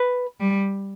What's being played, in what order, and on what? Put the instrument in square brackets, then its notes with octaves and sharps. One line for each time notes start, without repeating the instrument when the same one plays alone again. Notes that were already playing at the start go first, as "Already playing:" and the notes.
Already playing: [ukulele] B4
[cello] G3